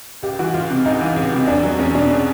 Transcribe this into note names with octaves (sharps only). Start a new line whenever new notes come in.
C#2 G4
E3 F#4
C#2 F4
C3
C#2 D#4
E3
C#2
C3
E2 D4
F#3
E2 C#4
B2 D4
C#4